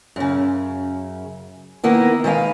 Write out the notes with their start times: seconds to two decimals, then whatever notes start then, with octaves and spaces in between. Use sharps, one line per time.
0.16 F#2 C#3
1.84 D#3 A#3 B3 E4
2.24 D#3 G#3 B4 F5